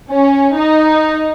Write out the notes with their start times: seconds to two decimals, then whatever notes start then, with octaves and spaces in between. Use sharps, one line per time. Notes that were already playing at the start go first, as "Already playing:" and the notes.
0.11 C#4
0.56 D#4